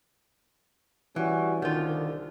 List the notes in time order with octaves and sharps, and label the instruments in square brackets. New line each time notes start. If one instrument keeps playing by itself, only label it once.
[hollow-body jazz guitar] E3 [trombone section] G3 C#4 F#4
[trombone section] C2 D3 [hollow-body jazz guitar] D#3 F4